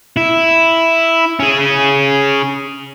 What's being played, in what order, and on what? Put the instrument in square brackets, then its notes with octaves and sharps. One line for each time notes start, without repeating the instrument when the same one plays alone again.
[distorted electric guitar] E4
C#4 G#4